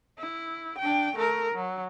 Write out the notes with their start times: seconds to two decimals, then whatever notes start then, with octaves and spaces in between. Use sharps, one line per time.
0.18 E4
0.79 D4 G5
1.16 A3 A#4
1.55 F#3